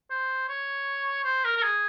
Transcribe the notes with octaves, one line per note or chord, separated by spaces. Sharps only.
C5
C#5
C5
A#4
A#4
G#4